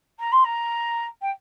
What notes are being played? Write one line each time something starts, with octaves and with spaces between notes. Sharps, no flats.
A#5
C6
A#5
G5